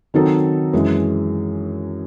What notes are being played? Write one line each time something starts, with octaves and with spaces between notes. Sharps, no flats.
D#3 F#3 C4 D#4 A4
F#2 E3 G#3